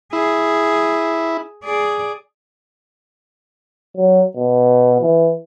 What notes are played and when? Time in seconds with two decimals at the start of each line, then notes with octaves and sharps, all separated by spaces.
0.13 E4 G#4
1.64 G#4 D5
3.97 F#3
4.36 B2
5.01 E3